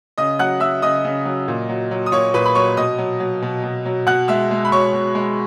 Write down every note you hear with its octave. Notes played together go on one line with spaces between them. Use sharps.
C#3 D#5 D#6
F#3 F#5 F#6
F#3 E5 E6
C#3 D#5 D#6
C#3
F#3
A#2
F#3
F#3
D#6
A#2 C#5 C#6
A#2 B4 B5
B5
F#3 C#5 C#6
B2 D#5 D#6
F#3
F#3
B2
B2
F#3
B2 F#5 F#6
G#3 E5 E6
G#3
B5
B2 C#5 C#6
B2
G#3